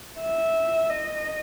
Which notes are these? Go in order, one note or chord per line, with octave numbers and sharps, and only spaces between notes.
E5
D#5